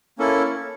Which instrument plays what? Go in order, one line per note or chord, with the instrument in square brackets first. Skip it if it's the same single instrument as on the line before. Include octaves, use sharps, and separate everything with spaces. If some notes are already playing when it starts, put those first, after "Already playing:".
[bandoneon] A#3 C#4 E4 A4